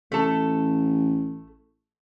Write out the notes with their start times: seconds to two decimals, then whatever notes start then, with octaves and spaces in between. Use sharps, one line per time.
0.12 A1 A3 A4